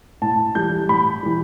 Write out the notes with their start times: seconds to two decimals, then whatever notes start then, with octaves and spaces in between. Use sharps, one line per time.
0.22 A2 A5
0.55 E3 G3 G6
0.89 A2 B5
1.23 E3 G3